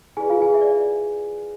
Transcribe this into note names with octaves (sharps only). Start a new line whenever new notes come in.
E4 G#4 B4 D5 G#5
F4 F5
G#4 G#5
E5
D5